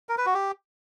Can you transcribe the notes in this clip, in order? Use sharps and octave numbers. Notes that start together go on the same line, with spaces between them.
A#4
B4
F#4
G4